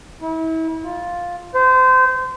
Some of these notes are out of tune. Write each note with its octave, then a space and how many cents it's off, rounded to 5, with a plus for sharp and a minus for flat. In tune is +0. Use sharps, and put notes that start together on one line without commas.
E4 -35
F4 +5
C5 -25